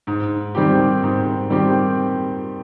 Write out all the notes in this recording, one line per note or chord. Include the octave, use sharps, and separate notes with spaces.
G#2
D#3 G3 C4 G4
G#2
D#3 G3 C4 G4